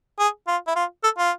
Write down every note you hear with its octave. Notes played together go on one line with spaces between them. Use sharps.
G#4
F4
E4
F4
A4
F4